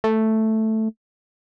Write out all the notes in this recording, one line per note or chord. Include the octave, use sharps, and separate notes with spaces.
A3